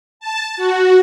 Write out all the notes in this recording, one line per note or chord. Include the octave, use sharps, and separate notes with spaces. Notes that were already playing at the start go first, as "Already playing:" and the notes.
A5
F#4